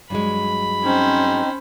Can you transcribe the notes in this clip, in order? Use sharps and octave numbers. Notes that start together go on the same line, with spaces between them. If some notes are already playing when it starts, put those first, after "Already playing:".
G2 F#3 G#3 B5
C4 C#4 D#4 C5